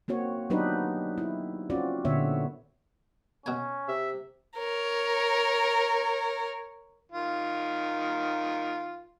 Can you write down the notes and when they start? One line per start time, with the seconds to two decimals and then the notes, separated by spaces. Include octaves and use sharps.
0.08 A#3 C4 F#4 C#5
0.50 F#3 B3 D4 D#4 G4 B4
1.18 E4
1.70 C4 C#4 F4 F#4 D5
2.05 A#2 D3 B3 C#5 E5
3.46 B2 C#4 G5 G#5
3.88 C3 E5
4.58 A#4 C#5
7.12 D#3 F4